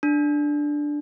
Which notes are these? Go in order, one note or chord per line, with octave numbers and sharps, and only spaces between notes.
D4